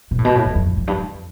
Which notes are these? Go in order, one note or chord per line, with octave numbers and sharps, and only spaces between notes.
B2
A2
B2
A2
E2
F2
A2
F2
G2
F2